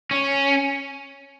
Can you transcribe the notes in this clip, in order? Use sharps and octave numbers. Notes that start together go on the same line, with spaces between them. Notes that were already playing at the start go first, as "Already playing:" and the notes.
C#4